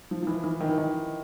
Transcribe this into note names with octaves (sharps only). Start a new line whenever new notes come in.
F3
F3
E3
E3
D#3
E3
D#3